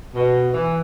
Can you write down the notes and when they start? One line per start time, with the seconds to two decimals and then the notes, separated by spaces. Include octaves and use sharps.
0.15 B2
0.54 E3